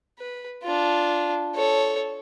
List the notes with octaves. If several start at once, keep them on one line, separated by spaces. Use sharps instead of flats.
B4
D4 F4
A4 C#5